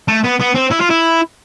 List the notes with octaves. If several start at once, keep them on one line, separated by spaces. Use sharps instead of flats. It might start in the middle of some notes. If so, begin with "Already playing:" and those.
A3
B3
B3
C4
E4
F4
E4